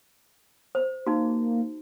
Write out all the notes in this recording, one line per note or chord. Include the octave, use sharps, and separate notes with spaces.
C5
A#3 D#4 F#4